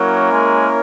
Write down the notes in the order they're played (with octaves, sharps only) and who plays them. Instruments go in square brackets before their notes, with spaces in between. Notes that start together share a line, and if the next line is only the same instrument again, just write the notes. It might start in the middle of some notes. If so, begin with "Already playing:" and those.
Already playing: [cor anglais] F#3 [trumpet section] A#3 C#4 E4 A#4 C#5
[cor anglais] G#3